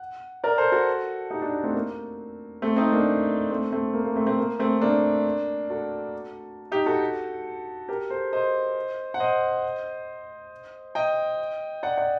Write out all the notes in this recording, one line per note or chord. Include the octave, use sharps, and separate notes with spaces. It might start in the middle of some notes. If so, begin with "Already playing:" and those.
Already playing: F#5
A#4 D5
A4 C5
F#4 A4
D#4 G4
D4 F#4
A3 C4
A#3
A3 C4
C4 D#4
A#3 D4
A3 C4
A3 C4
A#3
A#3
A3 C4
A3 C4
A#3
A3 C4
A#3 D4
F#4 A4
D#4 G4
F#4 A4
G4 A#4
A4 C5
C5 D#5
F#5
C5 D#5
D#5 G5
D5 F#5
D5 F#5